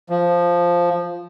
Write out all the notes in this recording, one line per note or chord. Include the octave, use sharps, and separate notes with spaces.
F3